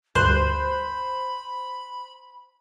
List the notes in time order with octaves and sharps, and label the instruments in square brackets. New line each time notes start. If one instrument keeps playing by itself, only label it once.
[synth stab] D2 G2 F#6 [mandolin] C5 [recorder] B5